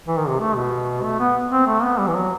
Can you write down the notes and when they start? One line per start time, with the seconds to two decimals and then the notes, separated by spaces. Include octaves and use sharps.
0.08 E3
0.18 D#3
0.28 C3
0.40 A3
0.55 B2
1.03 A3
1.20 B3
1.51 C4
1.67 A3
1.83 B3
1.99 G3
2.07 E3
2.15 F#3